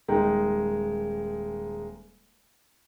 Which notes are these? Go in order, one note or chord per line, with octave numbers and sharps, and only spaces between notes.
D#1 G#3 A#3 D#4 G5